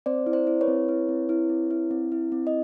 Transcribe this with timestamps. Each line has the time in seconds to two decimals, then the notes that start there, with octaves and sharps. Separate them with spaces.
0.06 C4 C5 D5
0.26 E4
0.33 C5 D5
0.47 E4
0.61 B4 C#5
0.68 C4
0.88 E4
1.09 C4
1.29 E4
1.49 C4
1.71 E4
1.91 C4
2.12 E4
2.32 C4
2.47 D#5